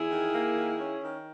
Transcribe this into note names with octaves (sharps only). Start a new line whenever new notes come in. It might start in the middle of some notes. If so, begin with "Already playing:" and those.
Already playing: E2 E4 G#4
D#3
A#3
D#3
C#4
D#3